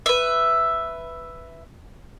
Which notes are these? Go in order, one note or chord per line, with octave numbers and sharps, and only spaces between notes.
B4 E5